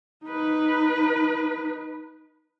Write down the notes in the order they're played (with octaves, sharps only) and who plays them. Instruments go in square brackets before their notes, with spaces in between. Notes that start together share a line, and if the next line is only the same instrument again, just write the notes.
[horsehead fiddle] D#4 B4